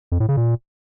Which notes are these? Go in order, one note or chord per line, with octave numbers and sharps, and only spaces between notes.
F2
A2
C#3
A#2